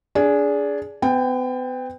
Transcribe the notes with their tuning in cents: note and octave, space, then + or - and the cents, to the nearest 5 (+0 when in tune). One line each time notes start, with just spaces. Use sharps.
D4 -20 G#4 +5
B3 +40 G5 +20